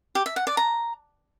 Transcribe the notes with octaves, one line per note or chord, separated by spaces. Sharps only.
G4
E5
F#5
D5
A#5